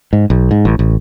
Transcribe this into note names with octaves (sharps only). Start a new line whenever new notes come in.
G#2
B1
G#2
A1
A1